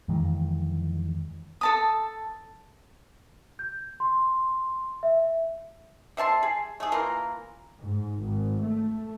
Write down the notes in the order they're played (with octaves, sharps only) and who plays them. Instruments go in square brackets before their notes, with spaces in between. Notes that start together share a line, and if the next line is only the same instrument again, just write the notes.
[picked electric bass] F2 D#3 E3 G#3
[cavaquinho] A4 A5 D#6
[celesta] G6
C6
E5
[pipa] C3 E5 A5 C6
G#4
A3 G#4
E3 A#3 F4 A#4
[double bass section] G#2
G#1
A3